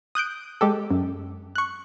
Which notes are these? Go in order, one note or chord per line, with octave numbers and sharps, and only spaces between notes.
D#6 F#6 G6 D7
G#3 G4 A4
F#2
C#6 F#6